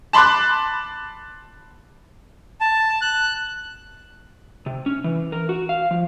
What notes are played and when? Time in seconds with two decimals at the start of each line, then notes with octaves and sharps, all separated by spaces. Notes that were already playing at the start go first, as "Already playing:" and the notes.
0.13 A5 B5 C6 D6 F#6
2.61 A5
3.02 F#6
4.66 C3
4.86 C#4
5.04 E3
5.32 A#4
5.49 F#4
5.69 F5
5.91 F3